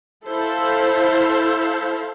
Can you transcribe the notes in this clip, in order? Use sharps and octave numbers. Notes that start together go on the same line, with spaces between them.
E4 A4 C5 F5